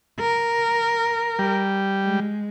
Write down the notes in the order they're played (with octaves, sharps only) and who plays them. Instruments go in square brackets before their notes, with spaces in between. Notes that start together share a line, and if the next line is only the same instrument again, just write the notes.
[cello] A#4
[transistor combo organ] G3
[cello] G#3